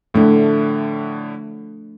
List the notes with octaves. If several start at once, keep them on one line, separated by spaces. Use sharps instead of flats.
A2 D3 F3 A3 D4